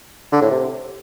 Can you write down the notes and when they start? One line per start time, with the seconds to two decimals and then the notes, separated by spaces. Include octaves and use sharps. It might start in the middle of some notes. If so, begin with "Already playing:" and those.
0.32 D3
0.41 A2
0.51 C3